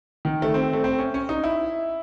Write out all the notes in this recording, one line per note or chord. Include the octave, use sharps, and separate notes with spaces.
D#3
A3
C4
A3
C4
C#4
C#4
D#4
E4